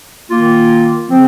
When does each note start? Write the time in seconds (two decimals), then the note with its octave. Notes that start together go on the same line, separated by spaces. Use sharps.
0.29 D#3 A#3 F4
1.08 C#3 F3 C4